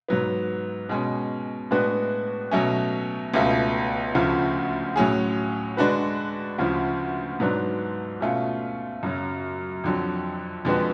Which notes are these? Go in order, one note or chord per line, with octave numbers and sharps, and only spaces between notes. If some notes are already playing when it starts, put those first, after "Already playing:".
G#2 F#3 B3
B2 G#3 C#4
A2 G#3 B3 D4 F#4
B2 F#3 A3 C#4
C#2 B2 A3 F4
D2 C#3 F3 A3
A2 F#3 C#4 G#4
D3 G#3 D4 F#4 B4
D2 C#3 F3
G#2 F#3 B3 D4
B2 A3 C#4 F4
F#2 C#3 F#3
F2 D3 F#3
F2 D3 G#3 B3 F#4